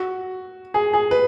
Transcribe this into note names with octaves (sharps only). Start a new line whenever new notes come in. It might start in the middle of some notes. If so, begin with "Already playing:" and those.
Already playing: F#4
G#4
G#4
B4